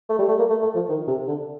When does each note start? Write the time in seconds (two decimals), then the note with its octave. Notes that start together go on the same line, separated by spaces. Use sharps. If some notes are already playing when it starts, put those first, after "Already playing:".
0.09 A3
0.19 G3
0.29 A3
0.39 A#3
0.50 A3
0.62 A3
0.75 F3
0.89 D#3
1.08 C3
1.28 D3